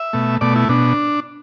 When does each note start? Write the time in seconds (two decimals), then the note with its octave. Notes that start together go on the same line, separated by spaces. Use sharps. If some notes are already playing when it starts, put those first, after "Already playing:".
Already playing: E5
0.13 B2 A3
0.41 B2 A3 D5
0.56 E4
0.69 B2 D4